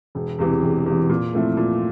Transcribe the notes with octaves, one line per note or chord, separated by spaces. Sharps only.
E1
E2 C3 E3
E1
E2 C3 E3
A#2
F3 A3 C4 E4
A#2